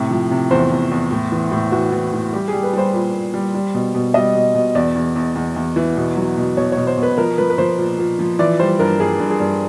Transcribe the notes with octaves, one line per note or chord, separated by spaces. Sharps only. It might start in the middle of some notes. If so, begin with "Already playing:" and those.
Already playing: A2 C3
F3
C3
E2 C5
E2
E2
A2
E3
A2
E3 F#4
E3
A2
G3 G4
G3 G#4
B4
G3 C5
A#2
A#2
G3
G3
B2
B2
G3 D#5
B2
B2
E2 D5
E2
E2
E2
E2
E3
B2
F#3
B2
B2 C#5
B2 C#5
C5
B2 B4
F3 A#4
F3 B4
B4
F3 C5
A#2
A#2
F3
E3 D5
G3 C5
G2 A#4
G2 G#4
G2
G#4
G2